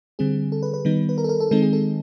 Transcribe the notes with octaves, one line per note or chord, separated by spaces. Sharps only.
D3 G3 C4 G#4
A4
B4
B4
D#3 G3 B3 D#4
B4
A#4
A4
A#4
A4
D#3 G#3 C4 D#4 A4
G#4
A4